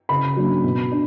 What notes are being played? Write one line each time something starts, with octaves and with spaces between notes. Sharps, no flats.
C#3 B5
F#3 A#3 D4
B2
D4